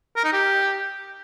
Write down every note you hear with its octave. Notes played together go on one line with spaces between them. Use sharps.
A#4
D#4
G4